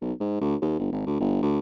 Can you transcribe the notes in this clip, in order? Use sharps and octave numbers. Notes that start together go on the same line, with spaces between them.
B1
G#2
D2
D#2
G1
G#1
D2
G1
D2